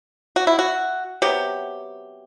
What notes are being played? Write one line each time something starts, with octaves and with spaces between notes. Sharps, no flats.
F#4
E4
F#4
C3 F#3 B3 G4